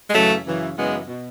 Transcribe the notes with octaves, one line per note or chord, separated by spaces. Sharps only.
G#3
F#2 C#3 E3 F#3 A3
F#2 C#3 E3
F#2 C#3 E3 G#3 B3
B2